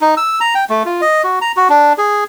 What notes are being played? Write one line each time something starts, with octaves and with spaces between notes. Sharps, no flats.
D#4
E6
A#5
G5
A3
F4
D#5
F#4
A#5
F#4
D4
G#4